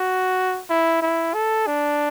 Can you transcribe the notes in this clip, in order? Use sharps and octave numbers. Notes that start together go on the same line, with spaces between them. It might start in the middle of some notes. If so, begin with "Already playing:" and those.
Already playing: F#4
E4
E4
A4
D4